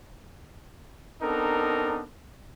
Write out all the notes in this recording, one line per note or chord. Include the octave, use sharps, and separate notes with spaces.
B3 C4 D4 D#4 A4 A#4